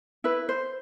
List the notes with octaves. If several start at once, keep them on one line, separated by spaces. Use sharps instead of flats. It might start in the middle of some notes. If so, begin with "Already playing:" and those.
E4 B4
C5